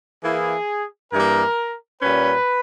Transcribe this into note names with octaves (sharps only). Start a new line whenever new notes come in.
E3 A#3 E4 G#4
G2 E3 G3 A#3 A#4
A#2 G3 C#4 B4